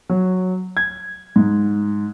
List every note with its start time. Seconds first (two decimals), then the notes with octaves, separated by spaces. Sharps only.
0.09 F#3
0.77 G#6
1.36 G#2